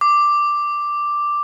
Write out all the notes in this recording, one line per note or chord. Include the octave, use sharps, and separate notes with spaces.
D6